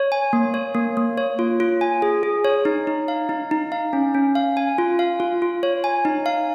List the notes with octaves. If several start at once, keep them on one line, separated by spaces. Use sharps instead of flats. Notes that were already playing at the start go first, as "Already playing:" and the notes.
Already playing: C#5
G#5
A#3
C#5
A#3
A#3
C#5
F4
F4
G#5
G#4
G#4
C#5
D#4
D#4
F5
D#4
D#4
F5
C#4
C#4
F5
G#5
F4
F5
F4
F4
C#5
G#5
D#4
F5